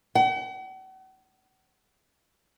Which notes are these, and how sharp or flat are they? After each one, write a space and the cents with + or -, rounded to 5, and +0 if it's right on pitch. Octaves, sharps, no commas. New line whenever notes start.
F#5 +45